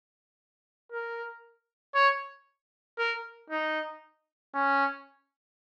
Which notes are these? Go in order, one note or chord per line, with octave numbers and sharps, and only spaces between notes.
A#4
C#5
A#4
D#4
C#4